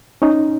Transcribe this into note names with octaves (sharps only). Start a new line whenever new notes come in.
C#4 D#4